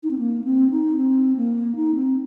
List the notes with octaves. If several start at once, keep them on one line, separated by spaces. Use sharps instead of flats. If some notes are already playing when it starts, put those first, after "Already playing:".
D#4
C4
A#3
C4
D#4
C4
A#3
D#4
C4